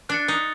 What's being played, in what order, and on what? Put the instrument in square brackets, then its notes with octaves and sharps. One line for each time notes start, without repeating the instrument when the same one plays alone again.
[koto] D4 [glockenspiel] F#6 A6 C#7
[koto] D#4